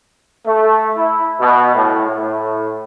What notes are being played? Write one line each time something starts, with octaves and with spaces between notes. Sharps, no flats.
A3
E4
B2
A2
A2